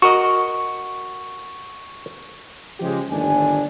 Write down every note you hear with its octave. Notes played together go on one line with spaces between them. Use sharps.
F#4 A#4 D#5 C#6
C#3 F3 G#3 G4
G1 D#2 A2 D4 G#5